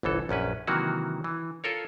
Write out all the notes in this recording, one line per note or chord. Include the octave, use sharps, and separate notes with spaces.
G1 C2 E3 A4
A#1 F#2 C#4 B4
C3 D#3 E3 F#3 A#3 F#4
E3
F4 A4 A#4 C#5